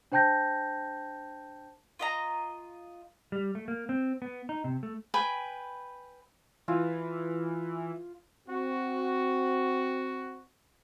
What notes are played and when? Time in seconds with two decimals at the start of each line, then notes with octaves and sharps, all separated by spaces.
0.12 D4 C5 G5 A5 G6 A#6
1.99 F4 D#5 A#5
3.32 G3
3.55 A3
3.68 A#3
3.89 C4
4.22 B3
4.49 D#4
4.64 C3
4.83 A3
5.14 B4 G5 G#5
6.68 E3 F4
8.48 C4 F#4